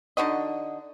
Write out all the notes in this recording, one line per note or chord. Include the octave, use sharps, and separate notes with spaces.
D3 D#4 F#4 D#5